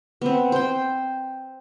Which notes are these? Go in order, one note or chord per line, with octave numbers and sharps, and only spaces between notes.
B3 C4
C5 G5